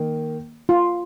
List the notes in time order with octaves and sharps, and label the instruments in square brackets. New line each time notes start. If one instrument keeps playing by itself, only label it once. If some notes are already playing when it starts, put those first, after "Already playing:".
Already playing: [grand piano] D#3 A#3
[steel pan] F4